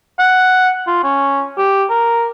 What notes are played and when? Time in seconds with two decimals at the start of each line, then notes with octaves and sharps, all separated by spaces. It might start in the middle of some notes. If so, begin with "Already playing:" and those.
0.19 F#5
0.87 F4
1.04 C#4
1.58 G4
1.90 A#4